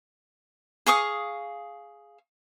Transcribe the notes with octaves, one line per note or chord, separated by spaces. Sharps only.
G#4 F5 C#6 D#6